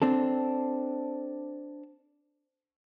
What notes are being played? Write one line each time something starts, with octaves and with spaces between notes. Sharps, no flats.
C4 D4 A4